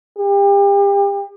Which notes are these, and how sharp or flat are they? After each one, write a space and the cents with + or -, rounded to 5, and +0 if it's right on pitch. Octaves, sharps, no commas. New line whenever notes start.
G4 +35